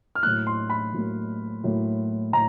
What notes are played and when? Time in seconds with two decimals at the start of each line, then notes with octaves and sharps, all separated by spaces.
0.15 F6
0.23 A2 F#3 A#3 F#6
0.47 C6
0.70 B5
0.94 A2 F#3 A#3
1.64 A2 F#3 A#3
2.33 A2 A#5